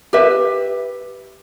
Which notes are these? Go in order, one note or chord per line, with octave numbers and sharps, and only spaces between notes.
G4 B4 E5